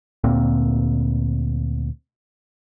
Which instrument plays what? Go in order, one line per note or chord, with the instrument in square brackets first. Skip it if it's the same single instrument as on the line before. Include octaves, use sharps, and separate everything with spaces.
[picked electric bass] D2 A#2 A#3 C4